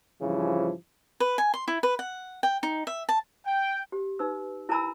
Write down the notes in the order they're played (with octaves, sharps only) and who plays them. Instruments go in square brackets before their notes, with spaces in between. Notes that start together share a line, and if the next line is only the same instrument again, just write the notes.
[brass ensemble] G2 C#3 E3 F3
[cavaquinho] B4
G#5
C6
E4
B4
F#5
G5
D#4
E5
A5
[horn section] G5
[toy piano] G4
D#4 B4 E6
E4 A#4 G#5 A#5 B5 E6